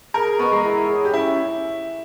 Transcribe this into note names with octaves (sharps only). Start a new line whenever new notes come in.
G#4 A#4
B3 D#5 A#5 C#6
G#3
E4
G#4 C#5
G4
C#4 E4